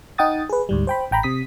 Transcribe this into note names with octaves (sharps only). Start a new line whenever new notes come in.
D#4 F#5 G5 D#6 A6
G#4 B4
D2 G#2 G3
C5 G5 B5
A1 G5 A#5 B5
C3 D#6 B6